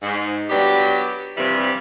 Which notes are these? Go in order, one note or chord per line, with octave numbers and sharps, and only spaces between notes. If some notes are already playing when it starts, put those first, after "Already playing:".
G#2
F#3 B3 D4 G4
G2 C3 E3 F3 G3